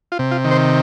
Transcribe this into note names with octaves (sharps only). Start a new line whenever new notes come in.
F4
C3
F4
D#3
C5